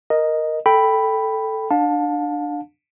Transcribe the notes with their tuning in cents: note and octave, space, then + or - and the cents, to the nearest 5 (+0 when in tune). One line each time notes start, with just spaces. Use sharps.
A#4 +0 D#5 +0
A4 +0 G5 +0 B5 +0
D4 +15 F5 +35 A5 +0